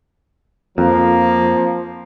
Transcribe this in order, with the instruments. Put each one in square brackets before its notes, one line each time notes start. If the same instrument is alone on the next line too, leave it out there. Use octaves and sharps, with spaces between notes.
[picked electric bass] F2 [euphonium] F3 [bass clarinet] A#3